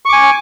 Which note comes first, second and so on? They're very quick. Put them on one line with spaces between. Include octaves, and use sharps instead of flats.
C#6 D6 G#5